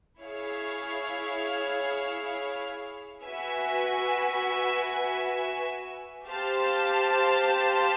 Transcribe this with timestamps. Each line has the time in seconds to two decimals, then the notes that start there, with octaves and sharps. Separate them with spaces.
0.19 E4 G#4 C#5 F5
3.22 F#4 B4 E5 G#5
6.25 G4 C5 F5 A5